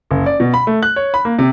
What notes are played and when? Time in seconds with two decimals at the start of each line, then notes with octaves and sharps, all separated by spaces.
0.11 F#1
0.26 D5
0.40 B2
0.54 B5
0.67 A3
0.83 F#6
0.96 C#5
1.14 B5
1.25 A#3
1.39 C3